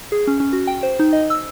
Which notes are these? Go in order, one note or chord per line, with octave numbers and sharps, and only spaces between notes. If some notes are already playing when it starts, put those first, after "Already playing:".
G#4
C#4
C#4
F#4
G5
C5
D#4
D#5
E6